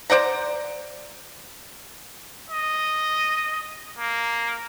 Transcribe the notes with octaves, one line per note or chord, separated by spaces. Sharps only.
C5 D5 F#5 A#5
D#5
A#3